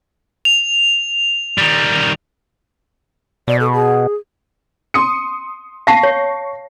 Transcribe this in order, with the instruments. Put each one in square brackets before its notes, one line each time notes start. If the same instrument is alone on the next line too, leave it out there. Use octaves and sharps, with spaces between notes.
[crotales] F7
[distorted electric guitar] D#3 G3
[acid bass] B2 [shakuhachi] D5
[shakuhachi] A4
G#4
[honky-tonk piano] C6 D#6 C#7
[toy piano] F5 A5 [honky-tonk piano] C#6 A#6 C7
[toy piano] C#5